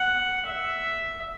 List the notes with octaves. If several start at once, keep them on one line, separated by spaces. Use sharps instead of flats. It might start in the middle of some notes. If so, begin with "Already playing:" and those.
Already playing: F#5
E5